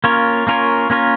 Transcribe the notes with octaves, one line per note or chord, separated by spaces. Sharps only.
A#3 C#4 F4 A#4 C#5
A#3 C#4 F4 A#4 C#5
A#3 C#4 F4 A#4 C#5